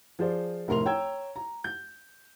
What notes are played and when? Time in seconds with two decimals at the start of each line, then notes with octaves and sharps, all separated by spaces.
0.19 F3 F4 G#4 C5 D5
0.68 F1 A2 A#4 C6 F7
0.85 C#5 G5 A#5 E6 G#6
1.36 A#5
1.64 G6